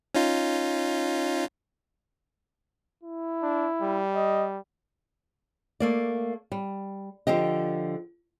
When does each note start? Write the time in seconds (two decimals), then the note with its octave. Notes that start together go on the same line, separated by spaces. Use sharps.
0.15 C#4 D#4 F4
3.03 E4
3.43 D4
3.82 G3
4.15 D#5
5.80 A3 A#3 D5
6.52 G3
7.27 D3 F3 G4 D#5